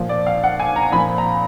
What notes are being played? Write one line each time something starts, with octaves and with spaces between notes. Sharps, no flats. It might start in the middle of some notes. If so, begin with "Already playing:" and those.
Already playing: A#2 F3
D5
F5
F#5
G#5
A#5
A#2 F3 B5
A#5